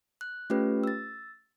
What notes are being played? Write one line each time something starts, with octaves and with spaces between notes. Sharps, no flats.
F#6
A3 C#4 F4 G4 B4
E6 A6